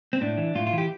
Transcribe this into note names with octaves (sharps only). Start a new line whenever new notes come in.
C4
A2 D4
E3
A2 F4
F4
E3 G4